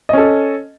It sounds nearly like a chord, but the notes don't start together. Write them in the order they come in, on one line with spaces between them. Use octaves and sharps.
D#5 C#4 A4